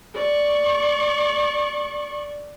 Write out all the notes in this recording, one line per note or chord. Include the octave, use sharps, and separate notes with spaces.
D5 C#6